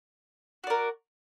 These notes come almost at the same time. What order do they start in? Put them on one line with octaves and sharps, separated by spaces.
F#4 D5 A#4